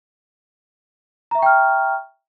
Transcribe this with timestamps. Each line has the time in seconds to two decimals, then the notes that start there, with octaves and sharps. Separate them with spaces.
1.31 A#5
1.35 E5
1.39 C#6
1.42 G5
1.46 F6